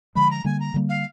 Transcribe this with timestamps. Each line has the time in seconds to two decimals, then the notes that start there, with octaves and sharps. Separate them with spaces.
0.15 D3 F3 G#3 B5
0.31 A#5
0.45 D3 G3 A#3 G#5
0.60 A#5
0.74 D3 G3 A#3
0.89 F5